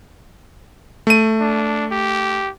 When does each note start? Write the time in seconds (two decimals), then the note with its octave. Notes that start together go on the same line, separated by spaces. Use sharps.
1.07 A3 D#7
1.40 D4
1.91 G4